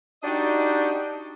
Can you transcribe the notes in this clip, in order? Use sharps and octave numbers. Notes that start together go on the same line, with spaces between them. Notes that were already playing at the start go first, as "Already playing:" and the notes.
D4 D#4 F#4 G4 D5 D#5